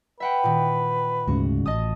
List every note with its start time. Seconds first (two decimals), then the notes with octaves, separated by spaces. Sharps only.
0.20 B4 E5 F#5 G5
0.44 A#2 D#3
1.27 D2 G#2 C#3 F#4
1.66 A1 D#5 A5 D#6